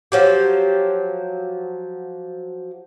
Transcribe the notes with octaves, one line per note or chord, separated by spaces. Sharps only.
F3 F#3 G4